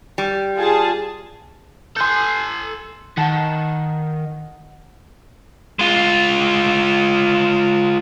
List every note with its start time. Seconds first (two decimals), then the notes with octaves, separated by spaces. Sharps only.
0.18 G3
0.57 F4 G#4 A5
1.96 A4 G#5 C6 F#6 G6
3.17 D#3 F#5 A5
5.79 G#3 F4